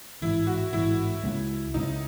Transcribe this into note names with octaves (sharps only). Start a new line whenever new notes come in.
A1 G#2 E3 E4
F#4
A1 G#2 E3 E4
C#2 C#3 G#3 C#4
C#2 C#3 G#3 C#4 D#4